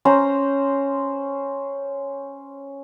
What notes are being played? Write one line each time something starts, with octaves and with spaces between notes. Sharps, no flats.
C#4 C5 A#5